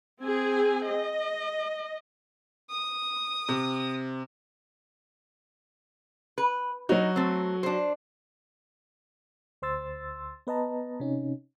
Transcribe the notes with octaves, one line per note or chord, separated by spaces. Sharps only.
C4 G#4 G#5
D#5
D#6
C3
B4
F#3 D#4 F#4
A3 C4
D4 C5
D2 C5 C6 E6 A6
B3 B4 D#5 A5 A#5
C3 C#4 D#4